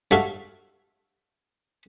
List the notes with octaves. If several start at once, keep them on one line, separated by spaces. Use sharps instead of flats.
G2 F#4 A4 E5 F5